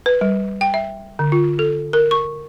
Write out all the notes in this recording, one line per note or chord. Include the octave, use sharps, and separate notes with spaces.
B4
G3
G5
E5
D3
F4
A4
A#4
C#6